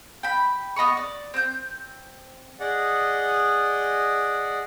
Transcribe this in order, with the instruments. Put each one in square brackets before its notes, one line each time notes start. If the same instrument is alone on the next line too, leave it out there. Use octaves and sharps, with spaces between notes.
[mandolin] G5 B5
B3 D#5 B5 C#6
D5
C4 G6
[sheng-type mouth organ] G#4 D5 D#5 F#5